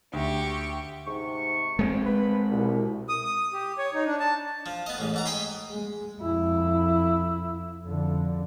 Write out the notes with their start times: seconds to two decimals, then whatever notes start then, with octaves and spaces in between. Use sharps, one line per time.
0.13 D2 G4 C#6
1.07 G#2 C3 C#6
1.79 G#3 A3 C4
2.06 B4 B5
2.51 C2 B2
3.09 D#6
3.24 D#6
3.53 G4
3.78 C#5
3.94 D#4
4.06 D4
4.20 A5
4.66 F3
4.86 B3 D#5
4.98 A1 G#3
5.14 G#2 F#5 A#5
5.25 D#5 G5 G#5 B5 C6
5.71 G#3
6.20 F2 E4
7.84 F2 D3